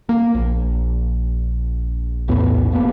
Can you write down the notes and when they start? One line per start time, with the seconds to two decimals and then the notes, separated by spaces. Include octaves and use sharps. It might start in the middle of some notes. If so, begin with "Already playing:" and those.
0.09 A#3
0.35 A#1
2.28 B1 E2 A2 B3
2.72 F1 A#3 B3